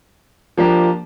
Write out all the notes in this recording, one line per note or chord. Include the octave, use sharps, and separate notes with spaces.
F3 A#3 D4 G4